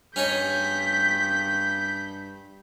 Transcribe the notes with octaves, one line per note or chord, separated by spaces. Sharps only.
G2 C#4 D#4 C#5 G6 B6